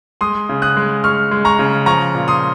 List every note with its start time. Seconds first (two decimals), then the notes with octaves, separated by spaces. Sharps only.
0.21 G#3 C6 D#6
0.49 C#3
0.62 D#6 F#6
0.77 G#3
1.04 G#3 C#6 F6
1.31 G#3
1.45 A#5 C#6
1.59 C#3
1.86 F3 A#5 C#6
2.15 A#2
2.28 C6 D#6